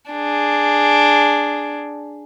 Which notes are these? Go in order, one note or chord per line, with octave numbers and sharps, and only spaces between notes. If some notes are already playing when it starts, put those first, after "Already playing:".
D4 G#4